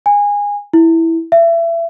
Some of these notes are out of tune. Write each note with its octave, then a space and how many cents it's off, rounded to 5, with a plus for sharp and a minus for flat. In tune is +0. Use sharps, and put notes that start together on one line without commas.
G#5 -20
E4 -5
E5 +30